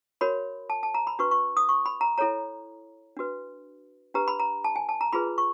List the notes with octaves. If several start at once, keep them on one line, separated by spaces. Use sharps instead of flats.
F#4 A#4 C#5 B5
A5
A5
A#5
B5
D4 F#4 B4 C#6
C#6
D#6
C#6
B5
A#5
E4 A4 C#5 A#5
D4 F#4 B4
D4 G4 B4 A#5
B5
A#5
A5
G#5
A5
A#5
F4 G#4 B4 B5
C#6